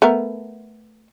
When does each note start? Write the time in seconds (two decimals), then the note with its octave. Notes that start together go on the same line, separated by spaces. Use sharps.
0.02 A3 B3 A#4